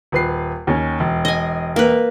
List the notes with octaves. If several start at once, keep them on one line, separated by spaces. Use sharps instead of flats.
D#1 B4 C7
D#2 C#4
E1
D#5 G#5
A#3 B4